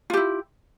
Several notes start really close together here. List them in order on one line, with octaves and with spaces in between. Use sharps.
F4 G4 E4